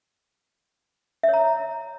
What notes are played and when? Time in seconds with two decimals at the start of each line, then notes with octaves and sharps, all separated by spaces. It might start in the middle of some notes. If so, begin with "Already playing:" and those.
1.23 E5
1.28 C#5
1.34 A#5